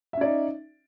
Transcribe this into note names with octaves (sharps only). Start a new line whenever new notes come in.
C#4 D#4 D5 E5